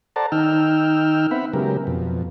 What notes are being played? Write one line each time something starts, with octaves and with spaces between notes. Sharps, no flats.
A4 C5 D5 F#5 A5 A#5
D#3 D#4 G5 E6 F6
B3 C4 E5 F#5 B5
C#3 F#3 G#3 B3 G4 A#4
F2 B2